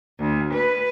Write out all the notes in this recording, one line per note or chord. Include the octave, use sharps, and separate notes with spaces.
D2
B4